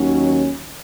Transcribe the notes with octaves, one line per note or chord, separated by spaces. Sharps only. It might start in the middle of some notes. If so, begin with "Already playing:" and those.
Already playing: D#2 D#3 F#3 C#4